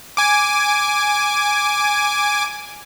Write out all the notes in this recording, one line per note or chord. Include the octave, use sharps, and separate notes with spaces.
G#5 D6